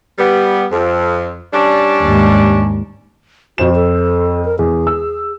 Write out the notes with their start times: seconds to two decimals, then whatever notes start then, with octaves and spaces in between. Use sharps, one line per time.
0.18 G3 B3
0.72 F2
1.53 G3 C#4 D4
2.02 D#2 G#2
3.58 F2 F#4 C5 E7
3.75 A4
4.45 A#4
4.59 E2 G#4
4.87 E6